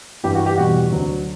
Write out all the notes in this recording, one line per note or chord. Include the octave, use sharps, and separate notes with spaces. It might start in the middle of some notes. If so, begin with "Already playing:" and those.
G2 E3 G3 G4
F#4
G4
E2 B2 G3 F#4
D2 D3 F#3